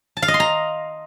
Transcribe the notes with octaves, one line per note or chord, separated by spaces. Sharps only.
A5
F5
D#5
C6
A#5